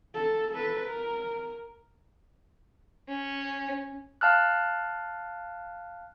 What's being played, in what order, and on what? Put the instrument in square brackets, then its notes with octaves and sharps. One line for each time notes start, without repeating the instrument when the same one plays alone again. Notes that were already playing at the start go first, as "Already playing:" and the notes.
[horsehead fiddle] A4
A4 B4
A#4
[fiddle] C#4
[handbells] F5 A5 F6 F#6